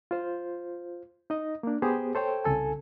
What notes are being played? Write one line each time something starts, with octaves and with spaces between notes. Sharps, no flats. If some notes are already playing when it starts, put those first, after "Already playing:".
F4 C5
D#4 D#5
A#3 D4
B3 G4 G#4 C5
A4 C5 C#5 G5
C2 C#3 A4 G#5